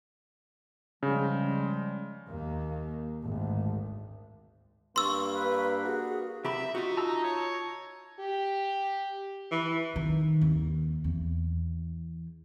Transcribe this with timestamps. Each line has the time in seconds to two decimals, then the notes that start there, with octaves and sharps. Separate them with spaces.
1.03 C#3 F3 G3 G#3
2.27 D#2 A#3
3.23 G#1 D2
4.96 G2 A#3 C6 C#6 E6
5.34 B4
5.85 F#4 G#4
6.45 C3 G4 E5 B5
6.75 D#4 F4 F#4
6.97 A5 A#5 E6
7.24 C#5
8.20 G4
9.51 E3 B4
9.96 D#3
10.41 D#2
11.04 E2